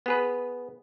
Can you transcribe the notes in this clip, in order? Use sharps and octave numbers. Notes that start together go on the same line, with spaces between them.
B3 G#4 B4